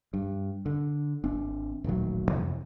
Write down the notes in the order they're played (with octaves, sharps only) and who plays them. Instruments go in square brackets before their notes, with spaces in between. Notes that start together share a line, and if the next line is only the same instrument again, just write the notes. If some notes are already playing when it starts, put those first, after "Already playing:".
[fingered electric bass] G2
D3
G#1 C4 D4
D#1 A1 D#3 F#3
F2 C3 E3